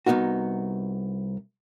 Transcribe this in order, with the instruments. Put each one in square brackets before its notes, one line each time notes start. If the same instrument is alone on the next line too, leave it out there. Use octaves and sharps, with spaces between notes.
[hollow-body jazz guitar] C2 F#2 B3 D#4 F#4